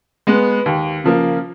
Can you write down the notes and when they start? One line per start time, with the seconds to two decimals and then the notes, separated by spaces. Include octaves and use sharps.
0.27 G#3 B3
0.66 D#2
1.04 C#3 F3 A#3